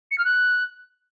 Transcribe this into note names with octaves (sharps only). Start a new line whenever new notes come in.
C#7
F6
F#6